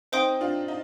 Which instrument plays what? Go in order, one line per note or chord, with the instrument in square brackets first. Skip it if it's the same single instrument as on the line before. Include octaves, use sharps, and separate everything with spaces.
[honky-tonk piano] C4 D#4 [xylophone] C5 G5 C6 D#6 G6
[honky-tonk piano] D4 F4
D#4